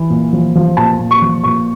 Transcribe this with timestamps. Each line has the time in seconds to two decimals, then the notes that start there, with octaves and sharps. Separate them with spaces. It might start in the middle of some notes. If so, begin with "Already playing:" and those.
Already playing: E3
0.10 A#2
0.33 F3
0.55 F3
0.77 A#2 A5
0.99 A#2
1.11 C#6
1.22 F3
1.44 A#2 C#6